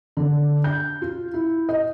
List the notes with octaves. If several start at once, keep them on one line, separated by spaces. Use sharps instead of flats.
D3
G6
F4
E4
D#5